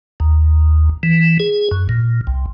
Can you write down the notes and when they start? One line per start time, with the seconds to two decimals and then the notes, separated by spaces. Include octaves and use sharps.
0.20 D#2
1.03 E3
1.40 G#4
1.71 F#2
1.89 A#2
2.27 C2